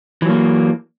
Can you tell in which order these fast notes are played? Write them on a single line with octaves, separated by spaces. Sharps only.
E3 F#3 A#3